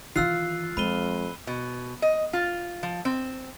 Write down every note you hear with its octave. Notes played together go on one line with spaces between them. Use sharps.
D#3 E3 F4 E6 F#6 C7
F2 G#3 B5 D#7 G7
B2
D#5
F4
F3
C4